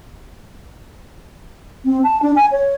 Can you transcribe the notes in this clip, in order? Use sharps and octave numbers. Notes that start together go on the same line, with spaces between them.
C4
A5
D4
G#5
C#5